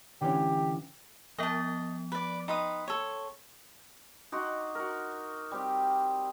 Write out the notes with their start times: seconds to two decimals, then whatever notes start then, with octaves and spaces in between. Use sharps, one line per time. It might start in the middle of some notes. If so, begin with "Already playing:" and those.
0.21 D3 E3 C#4 G4
1.38 F3 B3 D#5 A5
2.12 B4 D5
2.48 D#4 B4 G5 C6 D#6
2.88 A4 C#5
4.32 D#4 F#4 C6 D6
4.75 F#4 A#4
5.51 G3 C4 G4